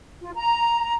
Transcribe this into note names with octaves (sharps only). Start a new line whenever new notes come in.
F4
A#5